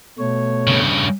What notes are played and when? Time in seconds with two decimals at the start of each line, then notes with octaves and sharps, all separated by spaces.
0.19 B2 A3 C#5
0.68 G2 C#3